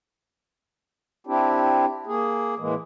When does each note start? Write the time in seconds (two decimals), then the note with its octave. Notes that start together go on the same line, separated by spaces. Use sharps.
1.27 C4 D4 E4 G4
2.06 A#3 G#4
2.59 A2 E3 G#3 A#3